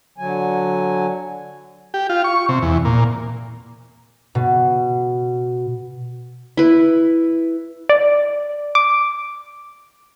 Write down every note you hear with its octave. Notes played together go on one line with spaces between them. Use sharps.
D3 F#3 G#5
G4
F4
C#6
C3
E2
A#2
B2
E4 B4
D5
D6